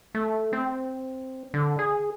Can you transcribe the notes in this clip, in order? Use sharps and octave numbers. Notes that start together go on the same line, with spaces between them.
A3
C4
D3
G#4